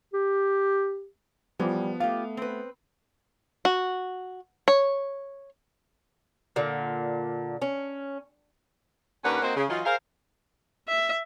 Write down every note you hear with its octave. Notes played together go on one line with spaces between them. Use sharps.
G4
E3 F3 G3 B3
A3 F4 G4 F5
C4 B4
F#4
C#5
A#2 D3
C#4
D#2 C#4 D4 A#4 B4 F#5
A#3 C4 D#4 F#4 C5
C#3
E3 F#3 D#4 F4
G#4 A#4 C5 F5
E5